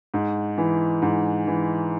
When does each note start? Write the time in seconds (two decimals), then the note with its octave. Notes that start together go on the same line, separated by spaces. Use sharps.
0.14 G#2
0.58 E3
1.02 G#2
1.47 E3